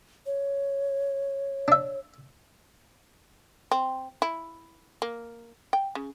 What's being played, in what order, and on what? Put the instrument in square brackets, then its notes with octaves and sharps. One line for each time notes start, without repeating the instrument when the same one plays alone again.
[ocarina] C#5
[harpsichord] D4 E5
[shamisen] C4
E4
A#3
G5
C#3